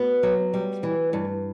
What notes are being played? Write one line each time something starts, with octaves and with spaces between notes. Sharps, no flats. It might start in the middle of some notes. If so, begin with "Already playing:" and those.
Already playing: B3 F#4
F#3
G3
E3
G2